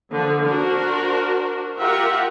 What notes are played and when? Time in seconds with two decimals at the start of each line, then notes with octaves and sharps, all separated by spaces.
0.12 D3 F3
0.46 D4 F#4 A#4 C5
1.78 F4 G4 A#4 E5 F#5